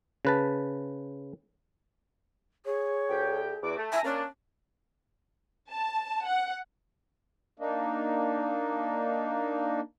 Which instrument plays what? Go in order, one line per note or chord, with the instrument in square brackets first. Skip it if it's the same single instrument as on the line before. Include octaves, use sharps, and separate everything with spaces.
[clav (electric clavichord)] C#3 B4 A5
[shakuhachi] G#4 [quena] C#5
[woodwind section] D2 G4 G5
[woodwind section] E2 F#4 D6 [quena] D5
[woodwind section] A3 [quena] A5
[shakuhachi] E5 [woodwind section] G#5 A#5
[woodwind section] A#3 D4 [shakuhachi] C#4
[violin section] A5
F#5
[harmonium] A#3 D4 D#4